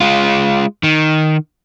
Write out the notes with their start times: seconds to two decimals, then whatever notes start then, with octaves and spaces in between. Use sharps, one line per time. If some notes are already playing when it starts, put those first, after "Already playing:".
0.01 G#3 F4
0.83 D#3